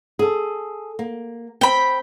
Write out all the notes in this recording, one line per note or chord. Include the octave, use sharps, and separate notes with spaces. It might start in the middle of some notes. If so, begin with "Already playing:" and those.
G#4 A4
A#3
C4 G5 B5